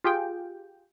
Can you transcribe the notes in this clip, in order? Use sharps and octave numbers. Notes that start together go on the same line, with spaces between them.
F4 G4 G#4 G5